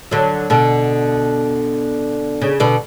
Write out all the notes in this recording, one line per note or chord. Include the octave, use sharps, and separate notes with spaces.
D3 F#3
B2 D3
C#3
B2 D3